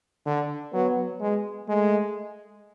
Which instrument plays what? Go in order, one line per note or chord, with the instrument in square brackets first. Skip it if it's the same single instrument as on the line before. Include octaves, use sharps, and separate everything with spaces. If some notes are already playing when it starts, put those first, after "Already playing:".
[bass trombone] D3
[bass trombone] F#3 [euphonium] B3
[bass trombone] G#3
[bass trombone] G#3 [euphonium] A3